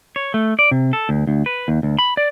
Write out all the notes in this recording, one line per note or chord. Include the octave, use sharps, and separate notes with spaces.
C#5
A3
D5
C3
A4
D2
D2
B4
D#2
D2
B5
D5